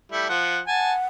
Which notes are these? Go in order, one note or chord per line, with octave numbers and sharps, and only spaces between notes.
G3 A3 E4
F3 F#5
F#5 G#5 A5